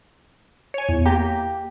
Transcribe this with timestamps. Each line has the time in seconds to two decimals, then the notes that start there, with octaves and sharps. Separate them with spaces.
0.74 C#5 G#5
0.89 E2
1.06 A#3 G4